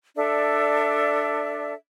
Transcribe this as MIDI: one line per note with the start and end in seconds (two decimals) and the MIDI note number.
0.15 1.73 62
0.15 1.73 69
0.15 1.73 74
0.15 1.73 76